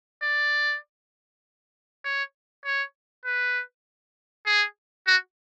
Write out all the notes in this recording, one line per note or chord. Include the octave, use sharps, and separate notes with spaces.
D5
C#5
C#5
B4
G#4
F#4